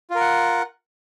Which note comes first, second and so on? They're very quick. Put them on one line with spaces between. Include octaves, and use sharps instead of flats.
F4 A#4 F#5